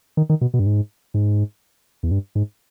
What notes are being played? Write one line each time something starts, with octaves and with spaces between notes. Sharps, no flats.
D#3
D#3
B2
B2
G2
G#2
G#2
E2
G2
G#2